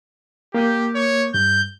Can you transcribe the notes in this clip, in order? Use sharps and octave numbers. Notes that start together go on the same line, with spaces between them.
A#3 G4 D6 G6
C#5
G2 G6